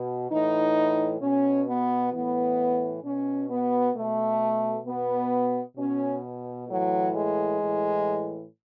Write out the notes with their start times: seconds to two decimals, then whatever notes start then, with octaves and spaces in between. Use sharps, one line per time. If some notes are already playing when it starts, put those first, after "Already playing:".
Already playing: B2
0.30 A2 E3 D#4
1.21 B2 C#4
1.68 B3
2.12 A2 E3 B3
3.04 B2 C#4
3.49 B3
3.95 B2 A3
4.86 B2 B3
5.77 B2 C#4
6.69 A2 E3 F#3
7.14 G#3
7.60 A2 E3